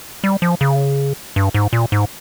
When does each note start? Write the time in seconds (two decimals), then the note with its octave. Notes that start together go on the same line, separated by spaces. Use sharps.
0.24 G3
0.42 F3
0.61 C#3
1.36 G2
1.54 G#2
1.73 A#2
1.92 G#2